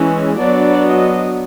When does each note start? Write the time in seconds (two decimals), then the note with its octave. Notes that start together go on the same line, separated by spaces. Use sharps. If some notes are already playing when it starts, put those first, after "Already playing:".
Already playing: E3 G#3 C#4
0.37 F#3 B3 D4 D5
0.84 D#5